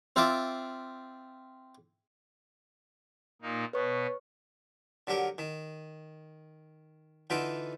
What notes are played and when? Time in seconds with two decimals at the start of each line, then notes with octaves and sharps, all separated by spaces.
0.16 C4 F4 E5 A5 D6
3.42 A#2 A#3 D#4
3.73 B2 B3 B4 C#5 C#6
5.07 D3 F#3 G4 A#4
5.38 D#3
7.30 D3 E3 D#4 F4 G5